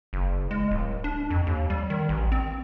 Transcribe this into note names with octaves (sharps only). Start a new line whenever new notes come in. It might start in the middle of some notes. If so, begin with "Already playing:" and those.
F#1
G#3
D1
D4
F2
D#2
G3
D#3
A1
C4